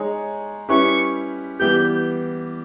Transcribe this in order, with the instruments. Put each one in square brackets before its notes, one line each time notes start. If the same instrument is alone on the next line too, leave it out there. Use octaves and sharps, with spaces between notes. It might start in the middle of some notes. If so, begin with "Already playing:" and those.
Already playing: [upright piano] G#3 D#4 G#4 C#5
[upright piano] G3 C#4 E4 G4 B4 [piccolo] C#6
[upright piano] E3 G3 B3 G4 [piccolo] G6